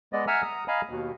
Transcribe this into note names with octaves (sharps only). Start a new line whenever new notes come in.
G#3 B3 D5 D#5
E5 F#5 G#5 A#5 E6 F6
A#5 D#6
D#5 F5 G#5 A#5 B5
D#2 B2